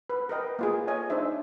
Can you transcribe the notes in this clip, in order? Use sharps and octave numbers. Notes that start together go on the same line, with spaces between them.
B4
A#4 B4 D#5 G5
A#3 F4 G#4
A4 C#5 D#5 G#5
D4 D#4 C5 E5